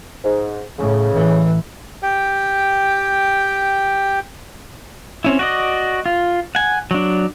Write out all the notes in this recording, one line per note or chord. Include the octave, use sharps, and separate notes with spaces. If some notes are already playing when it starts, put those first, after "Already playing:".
G#2
A2 C#3
A1 E3
G4 G5
C4 C#4 E4
F#4 D5 D#5
F4
F#5 G#5
F#3 D4